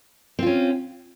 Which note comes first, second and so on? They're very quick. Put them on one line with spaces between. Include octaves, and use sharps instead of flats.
C4 F4 C#4